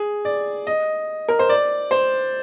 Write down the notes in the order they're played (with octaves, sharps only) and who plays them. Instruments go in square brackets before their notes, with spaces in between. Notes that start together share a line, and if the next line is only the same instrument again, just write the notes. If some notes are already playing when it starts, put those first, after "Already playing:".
Already playing: [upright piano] G#4
D5
D#5
A#4
C5
D5
C5